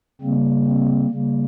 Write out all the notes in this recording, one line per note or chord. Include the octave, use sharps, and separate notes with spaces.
C#3 G3 A#3 C4
C4
C#3 G3 A#3